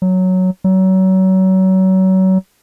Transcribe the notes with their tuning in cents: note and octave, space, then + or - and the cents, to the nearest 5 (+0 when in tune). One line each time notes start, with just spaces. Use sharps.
F#3 +0
F#3 +30